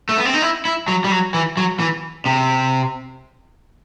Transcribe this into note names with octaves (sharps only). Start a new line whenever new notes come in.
A3
B3
C4
D#4
E4
E4
F#3
G3
F#3
E3
F#3
E3
C3